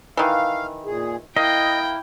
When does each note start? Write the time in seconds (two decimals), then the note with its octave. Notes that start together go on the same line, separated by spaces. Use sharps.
0.17 D#3 E3 F5
0.86 A#2 G#4
1.36 A#3 E4 D#5 G5